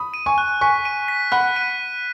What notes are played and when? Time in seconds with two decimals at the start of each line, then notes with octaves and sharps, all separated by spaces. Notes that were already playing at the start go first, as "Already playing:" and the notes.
Already playing: B5 D#6
0.14 D#7
0.26 G#5 C#6
0.38 F#6
0.61 G#5 C#6 B6
0.85 D#7
1.08 B6
1.32 F#5 B5 F#6
1.56 D#7